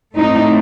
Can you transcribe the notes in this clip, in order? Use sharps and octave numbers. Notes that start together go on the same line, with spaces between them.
A2 A3 C4 D#4